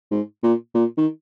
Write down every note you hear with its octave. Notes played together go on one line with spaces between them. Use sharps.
G#2
A#2
A#2
D#3